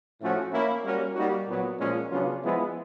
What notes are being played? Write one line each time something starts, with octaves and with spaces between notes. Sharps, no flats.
A2 F3 A3 C#4 F#4
A#3 C#4 E4
G3 A#3 C#4 F#4 A#4
G3 A#3 D#4 F#4
A#2 F#3 B3
A#2 F3 G#3 C#4
C#3 F#3 B3 D4 F4
F3 G#3 B3 E4